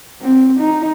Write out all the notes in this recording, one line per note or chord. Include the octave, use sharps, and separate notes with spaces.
C4
D#4